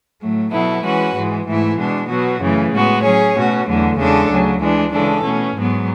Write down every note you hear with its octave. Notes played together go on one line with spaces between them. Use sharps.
A2 F#3 A3
B2 F#3 B3 E4 A4
E3 G#3 C#4 F#4 B4
G#2 E3 G#3
G#2 E3 A3 E4
B2 G#3 D4
B2 F#3 B3 F#4
F#2 C#3 E3 A3
A2 G#3 B3 F#4
F#3 C#4 G#4 C#5
B2 A3 C#4 F#4
E2 D3 F#3 A3
E2 C#3 G#3 D4 A4
D2 C#3 F#3
E3 G#3 D4
C#3 E3 G#3 D4 A4
B2 A3 C#4
G#2 F#3 B3